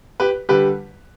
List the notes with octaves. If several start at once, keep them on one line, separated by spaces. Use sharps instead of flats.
G4 B4
D3 G3 G4 B4